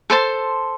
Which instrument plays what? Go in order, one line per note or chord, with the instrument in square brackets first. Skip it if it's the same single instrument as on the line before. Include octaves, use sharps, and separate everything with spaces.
[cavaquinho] A4 C5 A5 C6